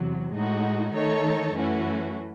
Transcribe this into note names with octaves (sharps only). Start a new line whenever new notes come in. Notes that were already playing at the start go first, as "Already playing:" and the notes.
Already playing: E2 C3 F#3
A2 G#3 D#4 F#4
D#3 A3 D#4 A4 C#5
F#2 E3 A3 C#4 F#4